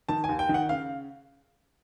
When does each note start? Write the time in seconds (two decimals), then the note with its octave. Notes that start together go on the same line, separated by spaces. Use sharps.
0.09 D#3 A5
0.24 G#5
0.29 D#2
0.39 G5
0.49 D#3
0.54 F#5
0.69 C#3 F5